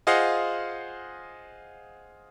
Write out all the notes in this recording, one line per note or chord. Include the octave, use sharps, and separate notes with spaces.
F4 G#4 C5 D#5 F5 F#5